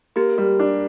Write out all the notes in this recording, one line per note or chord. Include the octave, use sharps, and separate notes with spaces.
A#3 G4
G3
D4